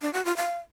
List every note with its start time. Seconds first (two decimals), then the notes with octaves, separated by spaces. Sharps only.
0.02 D4
0.14 F#4
0.25 F4
0.37 F5